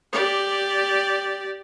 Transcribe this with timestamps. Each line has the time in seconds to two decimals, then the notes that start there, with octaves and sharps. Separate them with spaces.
0.12 G4 D5